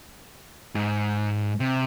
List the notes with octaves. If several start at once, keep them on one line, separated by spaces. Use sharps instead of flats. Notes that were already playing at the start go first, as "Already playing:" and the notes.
G#2
C3